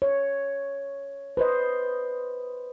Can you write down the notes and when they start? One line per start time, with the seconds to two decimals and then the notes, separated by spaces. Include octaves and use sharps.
0.02 C#5
1.37 B4 C5 D#5